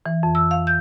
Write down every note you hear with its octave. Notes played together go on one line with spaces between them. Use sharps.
E3
F2
E6
F5
G6